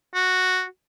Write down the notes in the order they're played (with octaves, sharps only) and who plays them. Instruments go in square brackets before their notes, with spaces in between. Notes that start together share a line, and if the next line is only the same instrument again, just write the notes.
[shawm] F#4